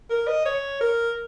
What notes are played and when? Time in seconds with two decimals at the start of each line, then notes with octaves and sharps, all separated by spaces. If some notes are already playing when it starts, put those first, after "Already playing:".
0.10 A#4
0.28 D#5
0.45 C#5
0.81 A#4